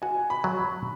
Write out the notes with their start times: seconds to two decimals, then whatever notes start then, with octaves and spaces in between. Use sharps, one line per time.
0.02 F#4 G#5
0.30 B5
0.44 F#3
0.58 B5